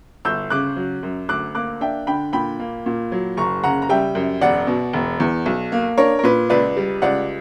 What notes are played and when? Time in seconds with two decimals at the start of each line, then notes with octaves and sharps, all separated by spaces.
0.25 G1 E6 G6
0.50 C#3 D6 F#6
0.76 F#3
1.03 F#2
1.29 D2 D6 F#6
1.55 A#3 D6 F#6
1.81 D4 E5 G5
2.07 D3 G5 B5
2.33 A#2 G5 B5
2.60 A#3
2.86 A#2
3.12 F#3
3.37 F#1 A#5 C#6
3.63 C#3 F#5 A#5
3.82 A#5
3.89 G3 E5 G5
4.15 F#2
4.41 E1 D5 F#5
4.67 B2
4.93 E1
5.20 E2
5.46 B1
5.72 A#3
5.98 D4 A#4 C#5
6.19 A#4
6.23 A#2 B4
6.50 C#2 B4 D5
6.77 G3
7.02 C#2 D5 F#5